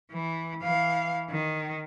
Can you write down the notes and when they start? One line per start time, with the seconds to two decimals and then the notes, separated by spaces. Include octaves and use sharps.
0.13 E3
0.63 E3 F5
1.30 D#3